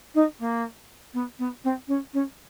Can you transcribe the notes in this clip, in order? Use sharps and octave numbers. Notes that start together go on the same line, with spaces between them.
D#4
A#3
B3
B3
C4
C#4
C#4